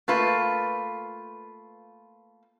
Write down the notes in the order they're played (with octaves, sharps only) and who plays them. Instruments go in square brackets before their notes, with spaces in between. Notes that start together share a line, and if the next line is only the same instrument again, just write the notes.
[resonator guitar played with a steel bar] A3 A#3 F4 B4